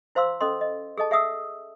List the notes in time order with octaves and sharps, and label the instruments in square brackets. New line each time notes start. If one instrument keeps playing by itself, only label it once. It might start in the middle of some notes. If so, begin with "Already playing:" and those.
[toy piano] E4 C5 F5 C6 E6
C#4 A4 D#5 C6
D#5
G#4 A4 D#5 A5
G#4 E5 F#5 D#6 E6